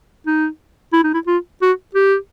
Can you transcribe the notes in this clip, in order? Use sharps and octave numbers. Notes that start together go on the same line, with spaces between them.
D#4
E4
D#4
E4
F4
F#4
G4